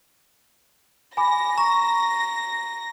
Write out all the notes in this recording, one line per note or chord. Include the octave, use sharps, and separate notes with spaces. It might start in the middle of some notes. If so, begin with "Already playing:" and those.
G#5 B5 D6 A#6
A#5 C#6